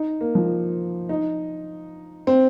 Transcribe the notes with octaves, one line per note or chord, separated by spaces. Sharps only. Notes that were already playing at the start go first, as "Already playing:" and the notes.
Already playing: D#4
A#3
F3
D#4
C4